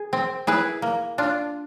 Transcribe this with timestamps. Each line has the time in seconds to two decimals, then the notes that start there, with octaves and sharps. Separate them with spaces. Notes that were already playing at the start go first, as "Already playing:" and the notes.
Already playing: G#4
0.13 C4
0.47 E4 G#4 B4
0.82 A#3
1.18 D4 F4